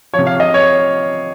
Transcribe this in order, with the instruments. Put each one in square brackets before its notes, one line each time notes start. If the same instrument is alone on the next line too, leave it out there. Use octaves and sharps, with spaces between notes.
[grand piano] F3 C#5
C3
F5
D#5
C#5